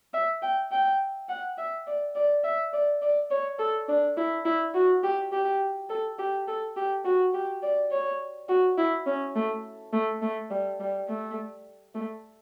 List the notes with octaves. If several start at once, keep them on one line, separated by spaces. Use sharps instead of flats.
E5
G5
G5
F#5
E5
D5
D5
E5
D5
D5
C#5
A4
D4
E4
E4
F#4
G4
G4
A4
G4
A4
G4
F#4
G4
D5
C#5
F#4
E4
C#4
A3
A3
A3
G3
G3
A3
A3